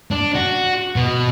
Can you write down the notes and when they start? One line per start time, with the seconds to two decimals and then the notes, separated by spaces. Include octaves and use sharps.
0.11 D4
0.35 F#4
0.96 B2